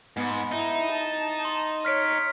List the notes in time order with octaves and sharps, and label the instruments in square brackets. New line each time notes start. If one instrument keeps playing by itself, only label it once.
[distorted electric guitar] G#2 [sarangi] B3
[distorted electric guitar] D#4 [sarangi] E4
[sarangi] A5
[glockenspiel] C6
[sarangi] C#5 [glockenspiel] F6 B6 D7